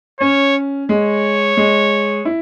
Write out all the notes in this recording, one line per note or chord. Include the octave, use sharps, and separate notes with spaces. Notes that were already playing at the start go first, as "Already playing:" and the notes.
C#4 C#5
G#3 C#5
G#3
E4